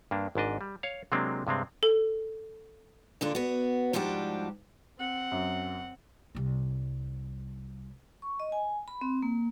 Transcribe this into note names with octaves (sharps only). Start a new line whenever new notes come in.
G2 A#3 D4
G#1 G#2 D4 D#5
G3
C#5 F5
C3 F#3 G#3 A#3 C4 D4
G2 C3 G#3 C4
A4
A#2 D3 D4 F4
B3 F#4
G#2 F3 G3 D4 F#4 G4
C4 F#5
F#2
C2 G3
C#6
D#5
G#5
B5
C4
A#3